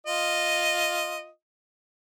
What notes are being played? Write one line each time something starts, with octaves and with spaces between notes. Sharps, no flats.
F4 D#5